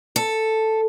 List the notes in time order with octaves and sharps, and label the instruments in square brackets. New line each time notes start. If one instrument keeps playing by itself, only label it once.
[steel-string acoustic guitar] A4